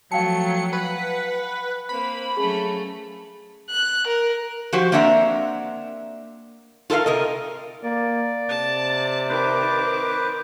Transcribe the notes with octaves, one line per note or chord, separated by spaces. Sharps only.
F3 F#3 A3 F5 G5 A5 C#7
B4 F#5
A#3 C4 B5
F#3 A3 C#4 G#4
F#6
A#4
F3 F#4 G4 C5
A#3 C4 D4 E5 F#5 A#5
F4 A4 A#4 E5 F5
C3 A#4 D#5
A#3 D5
C3 A5
D#3 B4 C5 D6